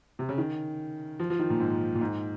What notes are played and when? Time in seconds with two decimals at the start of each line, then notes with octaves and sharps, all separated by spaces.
0.19 C3
0.29 C#3
0.38 D#3
1.20 F3
1.30 F3
1.39 D#3
1.50 A#2
1.60 G#2
1.95 A#2
2.01 G#2